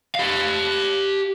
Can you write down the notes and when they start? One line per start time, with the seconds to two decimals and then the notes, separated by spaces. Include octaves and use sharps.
0.15 G4 F5